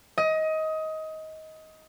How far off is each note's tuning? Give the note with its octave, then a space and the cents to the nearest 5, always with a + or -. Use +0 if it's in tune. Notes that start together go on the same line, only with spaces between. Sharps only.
D#5 +20